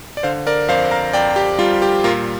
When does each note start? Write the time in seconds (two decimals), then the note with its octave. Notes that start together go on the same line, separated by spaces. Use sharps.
0.17 D5
0.23 D3 C5 F5
0.47 A#4 D5
0.68 F2 C5 F5
0.91 F5 A#5
1.13 F2 D5 G5
1.36 G4
1.59 G3 F4
1.82 G4
2.04 A#2 F4 A#4